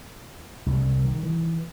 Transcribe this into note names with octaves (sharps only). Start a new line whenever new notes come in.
C2
D#3
E3